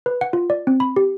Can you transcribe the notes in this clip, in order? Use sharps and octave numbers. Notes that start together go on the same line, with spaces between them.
B4
F#5
F4
D5
C4
B5
G4